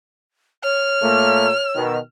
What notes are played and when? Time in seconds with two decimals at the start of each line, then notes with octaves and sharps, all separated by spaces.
0.64 C#5 F6
1.02 A#2 A3 A#3
1.76 B2 D#3